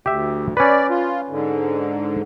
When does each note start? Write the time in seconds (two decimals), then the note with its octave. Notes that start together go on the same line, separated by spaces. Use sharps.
0.06 D2 G4 E5
0.57 C#4 B4 D5
0.90 F4
1.30 G#2 D3